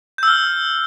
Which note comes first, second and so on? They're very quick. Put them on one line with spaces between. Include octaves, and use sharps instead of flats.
G6 E6 F6